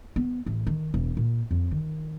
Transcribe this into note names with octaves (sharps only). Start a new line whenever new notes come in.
B3
A1
D#3
E1
A#2
F2
D#3